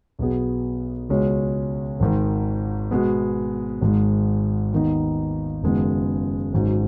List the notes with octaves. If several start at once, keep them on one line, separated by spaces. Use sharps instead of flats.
B1 B2 B3 G#4
C#2 B2 G#3 C#4
G#1 G#2 D#3
B2 G#3 B3
G#1 G#2 G#3
D#2 D#3 B3 D#4
F#1 F#2 D#3 G#3 B3
G#1 G#2 F#3